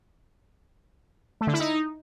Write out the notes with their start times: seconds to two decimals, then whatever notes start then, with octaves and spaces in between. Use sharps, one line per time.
1.41 A3
1.47 D3
1.53 E4
1.60 D#4